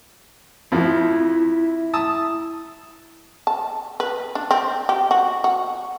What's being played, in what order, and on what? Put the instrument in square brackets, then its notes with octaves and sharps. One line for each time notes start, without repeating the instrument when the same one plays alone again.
[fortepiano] F2 F3 [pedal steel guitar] E4
[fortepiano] A5 D#6 E6
[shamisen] A5
B4
D4
C4
G4
F#4
F#4